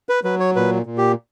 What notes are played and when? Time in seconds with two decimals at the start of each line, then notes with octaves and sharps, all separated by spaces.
0.09 B4
0.24 F#3 B4
0.40 C#5
0.56 A#2 B4
0.86 A#2
0.98 G4